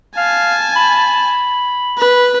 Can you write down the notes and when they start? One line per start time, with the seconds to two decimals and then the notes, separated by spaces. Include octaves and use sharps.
0.17 F5 G#5 A5
0.76 B5
1.98 B4